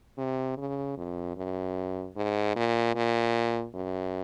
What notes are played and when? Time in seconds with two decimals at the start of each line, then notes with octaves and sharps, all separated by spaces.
0.18 C3
0.58 C#3
0.97 F2
1.37 F#2
2.16 G#2
2.56 A#2
2.95 A#2
3.75 F#2